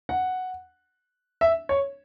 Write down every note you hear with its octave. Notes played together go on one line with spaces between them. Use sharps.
F#5
E5
C#5